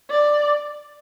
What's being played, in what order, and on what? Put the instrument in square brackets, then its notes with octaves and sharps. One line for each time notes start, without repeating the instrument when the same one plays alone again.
[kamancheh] D5